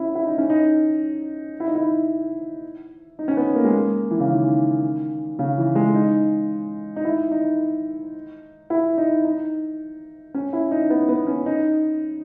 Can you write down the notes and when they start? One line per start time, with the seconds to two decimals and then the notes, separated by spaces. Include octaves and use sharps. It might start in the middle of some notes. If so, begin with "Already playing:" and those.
Already playing: C#4 E4
0.15 E4
0.26 D#4
0.38 C#4
0.50 D#4
1.60 E4
1.67 D#4
1.75 E4
3.19 D#4
3.28 C#4
3.37 B3
3.55 A#3
3.65 G#3
3.73 A#3
4.11 E3
4.20 C#3
4.29 D#3
5.39 C#3
5.58 E3
5.75 G#3
5.94 D#4
6.96 D#4
7.05 E4
7.31 D#4
8.70 E4
8.98 D#4
9.25 D#4
10.34 C#4
10.53 E4
10.71 D#4
10.90 B3
11.09 B3
11.27 C#4
11.46 D#4